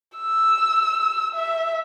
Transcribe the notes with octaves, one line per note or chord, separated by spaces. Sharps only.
E6
E5